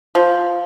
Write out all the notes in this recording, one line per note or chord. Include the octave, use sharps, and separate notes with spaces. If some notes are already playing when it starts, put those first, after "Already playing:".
F3